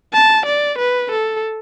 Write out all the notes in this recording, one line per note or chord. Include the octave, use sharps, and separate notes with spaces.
A5
D5
B4
A4